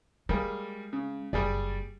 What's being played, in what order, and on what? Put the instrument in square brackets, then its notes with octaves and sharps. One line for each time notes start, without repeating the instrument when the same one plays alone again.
[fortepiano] G3 A#3 G#4 [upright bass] G#3
[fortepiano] C#3
[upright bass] F#1 [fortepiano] G3 G#4 D5